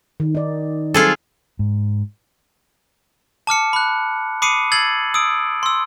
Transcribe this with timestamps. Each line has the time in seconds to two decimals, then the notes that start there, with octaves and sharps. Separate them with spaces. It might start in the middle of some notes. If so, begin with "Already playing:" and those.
0.20 D#3
0.35 D#4 D5
0.94 F#3 G3 C4 F4 G#4 A4
1.59 G#2
3.47 A5 D6 F6 C#7
3.73 B5 F#6
4.42 B5 D6 D#6 C7 C#7 D#7
4.72 E6 G#6 A6 C7 F#7
5.14 D#6 E6 D7
5.63 C6 E6